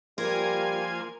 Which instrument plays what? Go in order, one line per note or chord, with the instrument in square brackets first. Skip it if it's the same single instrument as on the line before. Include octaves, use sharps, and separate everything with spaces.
[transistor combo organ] F3 A#3 F4 [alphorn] G3 [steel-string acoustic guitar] A#4 [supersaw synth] G#5 G#6